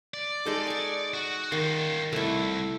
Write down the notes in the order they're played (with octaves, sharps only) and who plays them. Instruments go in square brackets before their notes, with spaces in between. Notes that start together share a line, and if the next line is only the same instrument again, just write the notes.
[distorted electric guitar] D5
[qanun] G#3 D#4 A4
G#5 C#6
[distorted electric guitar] F#4
[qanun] D#3 [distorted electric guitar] D#4 F4
[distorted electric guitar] C2 [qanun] A3 E4